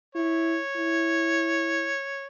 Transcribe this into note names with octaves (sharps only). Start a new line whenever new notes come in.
E4 C#5
E4